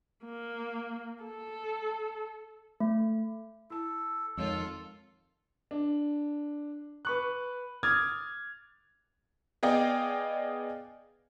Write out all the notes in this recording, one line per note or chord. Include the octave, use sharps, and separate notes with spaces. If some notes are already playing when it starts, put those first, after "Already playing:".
A#3
A4
A3
E4 A4 A5
F2 D#3 G#3 F4 A4 C#5 E6
D4
B4 C#6 F#6
D6 D#6 F6 G#6 A6
B3 G#4 D5 D#5 F5 G5